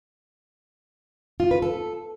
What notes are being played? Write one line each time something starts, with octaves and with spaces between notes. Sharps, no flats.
F4
B4
A4